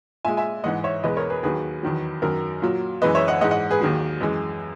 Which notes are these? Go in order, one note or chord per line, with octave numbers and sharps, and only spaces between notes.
A#2 G#3 E5 G#5
E5 G#5
G#2 E3 G#3 D#5 F#5
C#5 E5
E2 B2 G#3 B4 D#5
A#4 C#5
G#4 B4
D#2 D#3 F#3 G#4 B4
E2 D#3 F#3
F#2 D#3 F#3 A#4
A#2 F#3
F#2 E3 G#3 B4 D#5
C#5 E5
D#5 F#5
G#2 E3 G#3 D#5 F#5
D#5 F#5
G#4 B4
D#2 D#3 F#3 G#4
F#2 E3 G#3